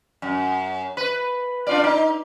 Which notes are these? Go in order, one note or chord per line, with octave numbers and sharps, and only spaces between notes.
F#2
B4
D4 F4 D5
D#4